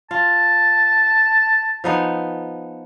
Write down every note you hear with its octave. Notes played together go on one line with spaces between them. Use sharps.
F4 A5
F3 B3 D#4